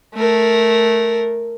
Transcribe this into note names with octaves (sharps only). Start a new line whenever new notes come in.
A3 A#4